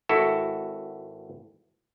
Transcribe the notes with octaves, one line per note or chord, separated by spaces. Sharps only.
G#1 E4 F#4 A4